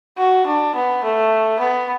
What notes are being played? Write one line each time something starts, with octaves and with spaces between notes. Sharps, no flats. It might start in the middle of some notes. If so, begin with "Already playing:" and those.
F#4
D4
B3
A3
B3